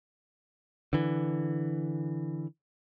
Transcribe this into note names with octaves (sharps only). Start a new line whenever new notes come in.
D3 E3